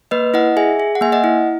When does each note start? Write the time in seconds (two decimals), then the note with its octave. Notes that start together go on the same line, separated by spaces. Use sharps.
0.11 A#3 B4 D#5
0.34 E4 D#5 F#5
0.57 G#4 E5 G#5
0.80 G#4
0.95 F#5
1.01 A#3 E5 G#5
1.12 D#5 F#5
1.24 E4